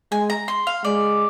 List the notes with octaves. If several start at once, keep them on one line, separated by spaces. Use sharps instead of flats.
G#3 G#5
A#5
C6
F5
G#3 D5